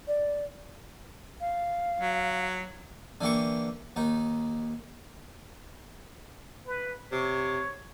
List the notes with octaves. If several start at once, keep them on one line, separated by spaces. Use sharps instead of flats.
D5
F5
F#3
D3 E3 A#3 G4 C#6
D#2 D#4
B4
C3 C#5